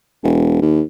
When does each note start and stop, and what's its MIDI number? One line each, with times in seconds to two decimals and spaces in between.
0.23 0.57 28
0.62 0.81 39